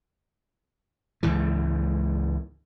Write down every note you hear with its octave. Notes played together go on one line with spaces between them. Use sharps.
C#2 G#2 E3